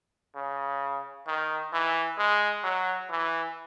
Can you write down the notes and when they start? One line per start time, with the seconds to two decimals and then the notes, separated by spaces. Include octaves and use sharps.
0.35 C#3
1.27 D#3
1.73 E3
2.18 G#3
2.64 F#3
3.10 E3